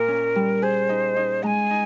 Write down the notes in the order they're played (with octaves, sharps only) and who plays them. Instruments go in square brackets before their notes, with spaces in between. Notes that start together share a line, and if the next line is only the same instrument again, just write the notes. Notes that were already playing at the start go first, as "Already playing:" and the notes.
Already playing: [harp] A#2 [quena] A#4
[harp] C#4
G3
[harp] G#4 [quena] C5
[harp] D#4
D#4
[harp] G#3 [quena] G#5 A#5
[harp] D#4